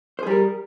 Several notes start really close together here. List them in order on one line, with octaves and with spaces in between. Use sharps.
C5 G#4 G3 A#4